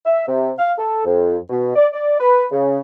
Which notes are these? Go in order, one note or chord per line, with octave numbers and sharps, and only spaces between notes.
E5
C3
F5
A4
F2
B2
D5
D5
B4
C#3